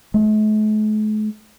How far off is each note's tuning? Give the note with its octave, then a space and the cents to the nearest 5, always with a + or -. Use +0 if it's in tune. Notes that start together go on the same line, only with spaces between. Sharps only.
A3 -45